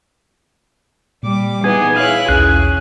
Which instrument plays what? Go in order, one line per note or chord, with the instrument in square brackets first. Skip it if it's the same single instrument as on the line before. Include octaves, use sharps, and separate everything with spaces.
[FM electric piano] A#2 [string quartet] G3 D6
[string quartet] E3 B3 D#4 [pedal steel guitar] G#4
[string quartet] E4 F#6 [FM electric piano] G#4 C#5 [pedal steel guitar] F5
[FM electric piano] B1 E2 [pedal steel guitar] C#4 F#6 [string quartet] G#4